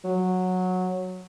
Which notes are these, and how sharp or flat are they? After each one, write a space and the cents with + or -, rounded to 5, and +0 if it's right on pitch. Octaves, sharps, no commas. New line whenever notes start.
F#3 -10